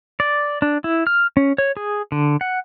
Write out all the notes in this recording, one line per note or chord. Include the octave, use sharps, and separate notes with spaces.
D5
D4
E4
F6
C#4
C#5
G#4
D3
F#5